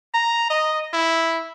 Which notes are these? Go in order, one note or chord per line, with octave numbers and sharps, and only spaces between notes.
A#5
D#5
E4